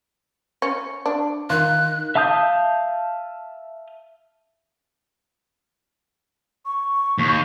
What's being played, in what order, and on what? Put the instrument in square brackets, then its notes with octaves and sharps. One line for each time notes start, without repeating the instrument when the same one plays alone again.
[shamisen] C#4
D4
[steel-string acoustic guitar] D#3 [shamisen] F4 [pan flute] F#6
[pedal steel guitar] E5 F5 A5 D#6 G6
[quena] C#6
[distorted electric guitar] D#2